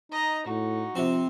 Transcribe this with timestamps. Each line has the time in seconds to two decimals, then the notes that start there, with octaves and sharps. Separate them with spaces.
0.12 D#4 D#5 A#5
0.46 A2 D#4 F#4
0.95 C3 F3 C4